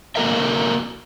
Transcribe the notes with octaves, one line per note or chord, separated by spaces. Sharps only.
A#3 F#4 A4 A#4 D#5 E5